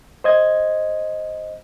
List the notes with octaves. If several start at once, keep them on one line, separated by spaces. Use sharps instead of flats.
C5 D#5 G#6